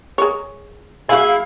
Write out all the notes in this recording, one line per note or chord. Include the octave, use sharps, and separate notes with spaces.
G#4 A#4 C#5
F#3 A#3 E4 G#4 F5 G#5